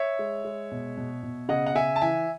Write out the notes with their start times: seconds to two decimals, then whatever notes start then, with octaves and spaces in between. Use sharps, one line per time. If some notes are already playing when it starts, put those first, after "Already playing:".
Already playing: C#5 E5
0.19 G#3
0.44 G#3
0.71 B2
0.97 B2
1.23 B2
1.49 C#3 D#5 F#5
1.66 F#5
1.75 C#3 E5 G#5
1.96 A5
2.01 E3 E5 G#5